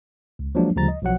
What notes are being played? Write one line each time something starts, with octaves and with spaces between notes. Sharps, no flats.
C#2
F3 F#3 G#3 A#3 D4
D2 C#3 F3 G3 A#5 A6
D#5
B1 F3 F#3 F#5